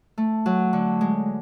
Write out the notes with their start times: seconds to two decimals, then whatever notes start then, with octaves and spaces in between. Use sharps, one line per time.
0.18 A3
0.46 F#3
0.73 D3
1.01 G#3